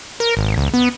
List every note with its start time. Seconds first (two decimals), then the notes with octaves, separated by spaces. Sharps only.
0.20 A#4
0.37 G#1
0.57 C#2
0.74 B3